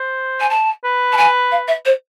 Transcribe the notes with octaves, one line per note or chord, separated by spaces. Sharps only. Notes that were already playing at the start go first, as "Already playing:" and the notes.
Already playing: C5
G#5
A5
B4
A5
G#5
F5
E5
C5